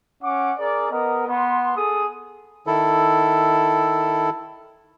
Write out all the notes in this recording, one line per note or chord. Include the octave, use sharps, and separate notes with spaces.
C#4 F#5 D6
G#4 A#4 D5
B3 A#4 D#5
B3 C6
G#4 A4 D#6
D#3 E4 A4